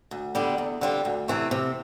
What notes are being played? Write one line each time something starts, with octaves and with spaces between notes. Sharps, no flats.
D2
D3 G3 B3
E2
D3 G3 C4 F4
D2
C3 E3 A3 C4
C3